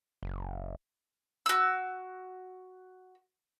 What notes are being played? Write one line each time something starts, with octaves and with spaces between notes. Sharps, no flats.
F#1
F#4 E6